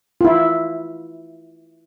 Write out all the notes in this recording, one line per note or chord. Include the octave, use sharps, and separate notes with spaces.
E4 F4